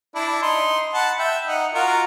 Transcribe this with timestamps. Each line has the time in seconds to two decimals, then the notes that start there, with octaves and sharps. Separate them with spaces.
0.15 D4 E4
0.43 D#4 C6
0.94 F#5 A5 B5
1.19 E5 G5
1.47 D#4 F#5
1.74 F4 F#4 A#4